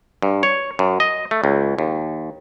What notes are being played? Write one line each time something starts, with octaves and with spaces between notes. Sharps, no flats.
G2
C#5
F#2
D#5
A3
C#2
D#2